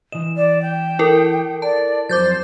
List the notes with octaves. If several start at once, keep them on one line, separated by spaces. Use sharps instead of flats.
E3 D#5 E7
D5
G5
E4 A4 A#4
D5 A5
F2 F#3 C5 D6 G6 A6